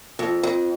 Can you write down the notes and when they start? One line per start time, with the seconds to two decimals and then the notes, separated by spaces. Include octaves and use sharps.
0.19 F2
0.43 F2